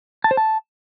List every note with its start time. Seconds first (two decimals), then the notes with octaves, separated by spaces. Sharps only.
0.24 A5
0.31 C5
0.37 A5